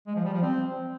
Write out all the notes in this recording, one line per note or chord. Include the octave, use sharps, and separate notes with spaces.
G#3
F3
G3
F3
C4